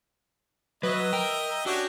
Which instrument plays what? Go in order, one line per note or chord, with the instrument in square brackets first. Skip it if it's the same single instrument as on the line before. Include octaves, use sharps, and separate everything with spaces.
[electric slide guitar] F#3 [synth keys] B4 [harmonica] D#5 E5
[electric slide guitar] A#4 [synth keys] G5
[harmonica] C#4 D4 G4 [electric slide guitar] F#4